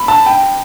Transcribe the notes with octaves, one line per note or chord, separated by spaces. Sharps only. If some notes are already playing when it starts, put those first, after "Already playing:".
Already playing: B5
A5
G5